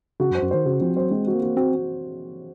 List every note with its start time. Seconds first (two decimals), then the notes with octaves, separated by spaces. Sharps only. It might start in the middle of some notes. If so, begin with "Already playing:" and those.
0.20 C#3 F#4
0.31 F#2
0.35 C5
0.43 F#2
0.51 D#3 C5
0.66 C#3 F#4
0.81 F3 C4
0.96 F#3 C5
1.11 G#3 C4
1.27 F#4
1.34 A#3
1.42 F#4
1.57 C4 F#4